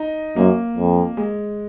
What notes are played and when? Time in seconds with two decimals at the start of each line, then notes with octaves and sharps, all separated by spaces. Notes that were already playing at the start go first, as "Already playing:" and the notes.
Already playing: D#4
0.36 F#2 A#3
0.77 F2
1.17 G#3